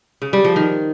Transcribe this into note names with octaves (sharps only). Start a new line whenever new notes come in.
C#3
G3
F3
D#3